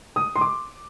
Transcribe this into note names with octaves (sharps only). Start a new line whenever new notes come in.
D#6
C6
D6